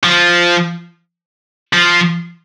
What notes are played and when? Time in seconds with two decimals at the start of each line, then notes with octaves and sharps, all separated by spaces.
0.04 F3
1.73 F3